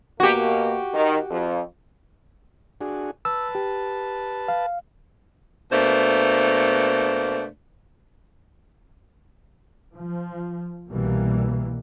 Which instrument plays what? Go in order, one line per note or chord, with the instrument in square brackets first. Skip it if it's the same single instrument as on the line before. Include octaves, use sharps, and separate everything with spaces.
[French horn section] B2 A#3 [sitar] F#4 G4
[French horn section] D#3
F2
[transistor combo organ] D4 F#4 G#4
[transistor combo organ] B4 A5 [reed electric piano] E6
[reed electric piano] G4
F5
[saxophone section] B2 A3 A#3 D4 C5
[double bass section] F3
C2 B2 E3 G3 A#3